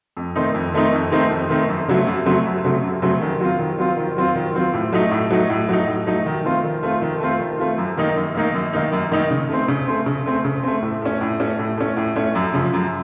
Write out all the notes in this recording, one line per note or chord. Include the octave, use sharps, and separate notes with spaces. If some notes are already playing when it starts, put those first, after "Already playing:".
F2
D#3 A3 C4 D#4
F2
D#3 A3 C4 D#4
F2
D#3 A3 C4 D#4
F2
D#3 A3 C4 D#4
F#2
C#3 F#3 A3 C4
F#2
C#3 F#3 A3 C4
F#2
C#3 F#3 A3 C4
F#2
C#3 F#3 A3 C4
D#3
F#3 C4 F4
D#3
F#3 C4 F4
D#3
F#3 C4 F4
D#3
F#3 C4 F4
A2
F#3 A3 D#4
A2
F#3 A3 D#4
A2
F#3 A3 D#4
A2
F#3 A3 D#4
D#3
A3 C4 F4
D#3
A3 C4 F4
D#3
A3 C4 F4
D#3
A3 C4 F4
F#2
D#3 A#3 D#4
F#2
D#3 A#3 D#4
F#2
D#3 A#3 D#4
F#2
D#3 A#3 D#4
C#3
A3 C4
C#3
A3 C4
C#3
A3 C4
C#3
A3 C4
A2
A3 C#4
A2
A3 C#4
A2
A3 C#4
A2
A3 C#4
F#2
C#3 F3
F#2